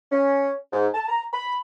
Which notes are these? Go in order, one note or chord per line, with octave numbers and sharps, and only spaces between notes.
C#4
G#2
A5
A#5
B5